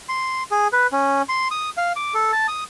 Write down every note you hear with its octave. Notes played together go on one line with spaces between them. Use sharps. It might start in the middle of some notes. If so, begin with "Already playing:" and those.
C6
G#4
B4
C#4
C6
D#6
F5
D6
A4
A5
D#6